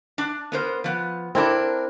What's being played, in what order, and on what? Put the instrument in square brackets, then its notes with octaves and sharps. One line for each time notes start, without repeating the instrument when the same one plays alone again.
[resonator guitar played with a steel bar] D4
B3 A#4 C5
F3 B3
[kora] C4 E4 A4 [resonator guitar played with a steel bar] D4 A#4